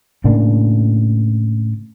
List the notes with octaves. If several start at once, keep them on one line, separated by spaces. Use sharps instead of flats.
A2 C#3 A#3 D4